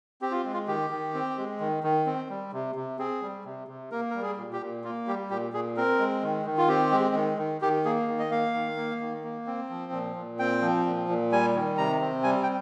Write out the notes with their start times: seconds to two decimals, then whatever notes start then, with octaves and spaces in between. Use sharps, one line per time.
0.21 C4 G4
0.31 F4
0.45 G#3
0.54 F4
0.68 D#3 G4
0.90 D#3
1.14 C4
1.38 G#3
1.60 D#3
1.83 D#3
2.06 C4
2.29 G3
2.53 C3
2.75 C3
2.99 C4 G#4
3.22 G3
3.45 C3
3.68 C3
3.91 A#3 A#4
4.10 G3 A#4
4.22 G#4
4.38 A#2
4.53 G4
4.61 A#2
4.84 A#3 F4
5.07 G3 G4
5.30 A#2 G4
5.53 A#2 G#4
5.77 C4 A#4
5.99 G#3
6.23 D#3
6.46 D#3
6.58 F4
6.68 C4 G4
6.92 G#3
7.15 D#3
7.38 D#3
7.61 D#3 G4
7.85 A#3 G#4
8.08 D#3
8.19 D#5
8.31 A#3 F5
8.54 D#3
8.77 A#3
9.01 D#3
9.24 A#3
9.47 C4
9.69 F3
9.92 A#2
10.16 A#2
10.39 C4 G5
10.62 F3
10.86 A#2
11.09 A#2
11.32 G3 G#5
11.55 D#3
11.78 C3 A#5
12.01 C4
12.24 G3 G#5
12.43 G5